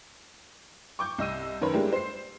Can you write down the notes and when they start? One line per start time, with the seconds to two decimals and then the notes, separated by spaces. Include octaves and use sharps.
0.99 C#6 D6 G6
1.18 C2 D#5 E6 D#7
1.61 F#2 D#3 A#4 B4 C#5 B5
1.73 G3 G#3 A#3 D4 E4 G4
1.93 C5 C7